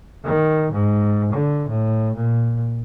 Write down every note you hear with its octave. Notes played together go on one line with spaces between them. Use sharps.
D#3
G#2
D3
A2
A#2